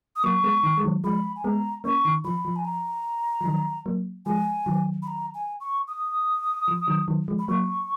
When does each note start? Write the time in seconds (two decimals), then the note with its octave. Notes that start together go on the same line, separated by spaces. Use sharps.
0.16 D#6
0.23 F#3 A#3 C#6
0.44 G#3 B3
0.63 D#3
0.77 G#3
0.84 D#3 F#3
1.04 F3 G#3 B5
1.36 G#5
1.44 G#3 B3 A#5
1.84 A#3 C#4 C#6
2.05 D#3
2.24 F3 B5
2.45 F3
2.56 G#5
2.65 A#5
3.41 F3
3.45 D#3 F#3
3.86 F#3 A#3
4.26 F3 G#3 G#5
4.66 D#3 F#3
5.02 B5
5.07 A#5
5.34 G#5
5.60 C#6
5.88 D#6
6.68 F3
6.87 D#3 F#3
7.08 D#3 F#3
7.28 F3 G#3
7.39 B5
7.48 F#3 A#3 C#6